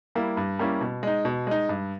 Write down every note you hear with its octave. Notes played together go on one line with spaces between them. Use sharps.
G3 A#3 E4
G2
G3 A#3 C#4 E4
B2
G#3 D#4
B2
G#3 D#4
G2